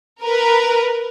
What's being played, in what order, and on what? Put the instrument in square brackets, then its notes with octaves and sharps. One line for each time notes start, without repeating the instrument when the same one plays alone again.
[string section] A#4 B4